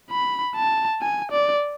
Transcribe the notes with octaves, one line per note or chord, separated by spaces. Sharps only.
B5
A5
G#5
D5